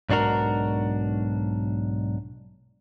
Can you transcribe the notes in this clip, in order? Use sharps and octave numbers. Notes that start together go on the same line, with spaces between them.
B1 G#2 D4 F#4 A#4